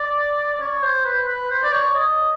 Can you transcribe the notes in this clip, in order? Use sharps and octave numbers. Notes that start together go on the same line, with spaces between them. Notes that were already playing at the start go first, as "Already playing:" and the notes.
Already playing: D5
D5
C#5
C5
B4
B4
C5
D5
C#5
D#5